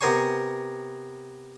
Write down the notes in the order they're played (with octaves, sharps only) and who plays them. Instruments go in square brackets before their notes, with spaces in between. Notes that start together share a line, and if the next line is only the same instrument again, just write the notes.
[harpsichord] C3 B3 A#4 C5 G#5 C#6